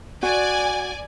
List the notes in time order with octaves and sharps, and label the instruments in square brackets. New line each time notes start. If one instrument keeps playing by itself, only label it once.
[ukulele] F#4 [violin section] D5 G#5